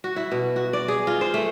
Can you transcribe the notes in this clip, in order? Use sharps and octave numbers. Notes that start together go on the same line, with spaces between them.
F#4
E4
B2
F#4
D5
G#4
F4
C5
A3